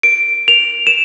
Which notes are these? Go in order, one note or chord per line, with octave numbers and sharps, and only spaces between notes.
D7
F7
E7